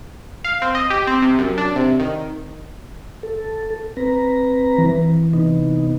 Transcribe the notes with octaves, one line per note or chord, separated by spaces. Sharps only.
F5
C4
D#5
G4
C4
C3
F#2
D4
C3
D#3
A4
C4 B4 A#5
E3
C3 B3 D#4